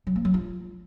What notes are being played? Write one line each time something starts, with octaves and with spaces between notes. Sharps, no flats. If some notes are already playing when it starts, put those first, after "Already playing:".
F#3
A#3
F#3
F4